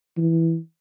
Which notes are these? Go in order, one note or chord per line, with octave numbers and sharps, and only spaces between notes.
E3